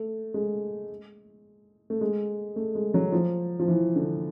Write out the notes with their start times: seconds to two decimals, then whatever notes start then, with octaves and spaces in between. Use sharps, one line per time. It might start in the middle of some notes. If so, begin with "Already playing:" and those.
Already playing: A3
0.34 G#3
1.90 A3
2.01 G#3
2.56 A3
2.75 G#3
2.94 F#3
3.12 F3
3.59 F3
3.68 E3
3.96 D3